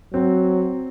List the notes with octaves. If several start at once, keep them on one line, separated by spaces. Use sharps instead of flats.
F#3 C4